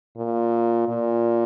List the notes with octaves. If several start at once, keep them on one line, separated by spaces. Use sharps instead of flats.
A#2
A#2